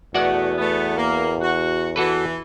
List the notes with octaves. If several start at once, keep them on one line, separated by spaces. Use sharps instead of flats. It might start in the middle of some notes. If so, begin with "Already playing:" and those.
E2 B2 A3 B3 F#4 D5 F#5
A3 B3
A#3
F#4
E3 F#4 A4 B4